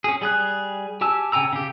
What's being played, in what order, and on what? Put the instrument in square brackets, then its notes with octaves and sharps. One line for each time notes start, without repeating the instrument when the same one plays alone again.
[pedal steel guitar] C#4 G#4
G3 G#4 F#6
G4 G#5 A5 E6
C#3 G5 G#5 A#5 E6
C#3 G4